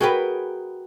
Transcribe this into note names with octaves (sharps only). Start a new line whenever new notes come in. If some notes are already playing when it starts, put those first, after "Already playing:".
F#4 G#4 A#4 B4 G5 D7